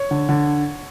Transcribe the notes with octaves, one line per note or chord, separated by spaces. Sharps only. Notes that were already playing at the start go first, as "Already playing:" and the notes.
Already playing: C#5
D3
D3